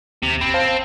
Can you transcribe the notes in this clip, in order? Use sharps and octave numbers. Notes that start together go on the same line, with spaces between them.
D#2 C3
G1 C4 B5
C5 F5 A5